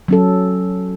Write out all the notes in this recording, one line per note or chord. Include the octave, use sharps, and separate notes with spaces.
F#3 C#4 A4